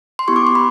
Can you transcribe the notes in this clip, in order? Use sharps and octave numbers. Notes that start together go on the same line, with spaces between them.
C6
B3 E4 G4 C#6
D6
C6
B3 B5